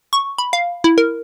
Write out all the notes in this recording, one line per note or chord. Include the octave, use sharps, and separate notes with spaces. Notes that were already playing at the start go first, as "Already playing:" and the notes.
C#6
B5
F5
E4
A#4